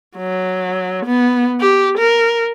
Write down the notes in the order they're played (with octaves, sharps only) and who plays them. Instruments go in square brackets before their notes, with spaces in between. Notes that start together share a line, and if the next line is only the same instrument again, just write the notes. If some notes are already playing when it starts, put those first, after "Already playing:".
[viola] F#3
B3
G4
A#4